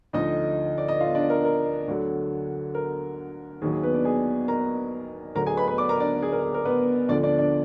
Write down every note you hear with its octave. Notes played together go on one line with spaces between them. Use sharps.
D2 D3 F3 D#4 D#5
D5
D#5
F4 F5
D4 D5
A#4
A#4
D2 D3 F#3
A#4
D#2 D#3 F#3 G#4
G#4
B3 B4
D4 D5
G#4 G#5
A#4 A#5
D2 D3 F#3 A#4 A#5
G#4 G#5
B4 B5
B4 B5
D5 D6
A#4 A#5
D4 D5
G#4
A#4
G#4
A#4
B3 B4
D2 D3 F3 D4 D5
D4 D5
D4 D5